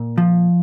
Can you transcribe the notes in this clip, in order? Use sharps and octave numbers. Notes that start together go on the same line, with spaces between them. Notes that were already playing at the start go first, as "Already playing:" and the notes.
Already playing: A#2
F3